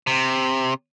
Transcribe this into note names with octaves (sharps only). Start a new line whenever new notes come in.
C3